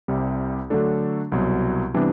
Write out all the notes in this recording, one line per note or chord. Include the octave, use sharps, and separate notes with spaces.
C2 C3 G3
D3 F#3 A3 D4 A4
C2 B2 F#3
C3 E3 G3 B3 D4